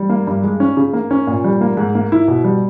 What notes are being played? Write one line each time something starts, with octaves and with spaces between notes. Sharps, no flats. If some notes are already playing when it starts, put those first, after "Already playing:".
Already playing: G3
A#3
G2
G#3
C#4
C#3
A#3
C#4
A#2
G3
A#3
G#2
A#3
E4
B2
G3